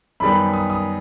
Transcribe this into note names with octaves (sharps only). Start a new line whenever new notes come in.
F#2 D#3 G3 B3 B5
D#6
D#6